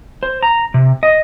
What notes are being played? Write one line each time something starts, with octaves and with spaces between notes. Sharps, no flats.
C5
A#5
C3
D#5